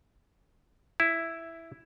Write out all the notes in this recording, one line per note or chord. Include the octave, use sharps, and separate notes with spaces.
E4